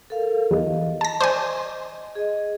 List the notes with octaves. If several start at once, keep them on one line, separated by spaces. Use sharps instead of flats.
A4 A#4 F5
E2 D#5
A5 A#6
C5 D5 G#5
G#4 D#5